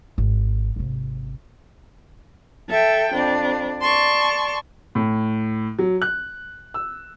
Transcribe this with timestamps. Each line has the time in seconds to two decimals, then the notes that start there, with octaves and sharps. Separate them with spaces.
0.18 G#1
0.76 G#1 C3
2.69 A4 E5 G5
3.12 F2 D4
3.82 D5 A5 C6 C#6
4.95 A2
5.79 F#3
6.02 F#6
6.74 E6